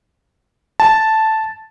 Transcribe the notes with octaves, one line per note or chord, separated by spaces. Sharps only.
A5